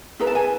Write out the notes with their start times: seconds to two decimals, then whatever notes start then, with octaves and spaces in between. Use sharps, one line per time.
0.20 E4 G#4 B4 A#5
0.27 A5
0.35 G#5